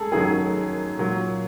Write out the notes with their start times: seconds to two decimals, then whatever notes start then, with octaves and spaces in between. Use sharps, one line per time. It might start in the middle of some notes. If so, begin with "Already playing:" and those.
Already playing: F#2 G#4 A4
0.12 F#2 D#3 F#3 G#4
0.99 A#2 F#3